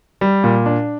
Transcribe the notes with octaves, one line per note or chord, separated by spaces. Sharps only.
G3
A#2
D4